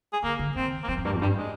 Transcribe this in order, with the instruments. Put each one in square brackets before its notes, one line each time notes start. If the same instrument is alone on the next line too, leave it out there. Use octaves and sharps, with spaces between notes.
[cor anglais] G#4
[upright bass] D3 [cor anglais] A#3
[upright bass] D3
[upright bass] D#3 [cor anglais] C4
[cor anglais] A#3
[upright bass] F3 [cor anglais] C4
[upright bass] F2
[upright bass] G2 [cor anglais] A#3
[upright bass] F2
[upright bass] G2 [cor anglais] G3
[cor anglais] G#3